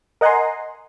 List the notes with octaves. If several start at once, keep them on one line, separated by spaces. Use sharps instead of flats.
A#4 D#5 F#5 G#5 A#5 C6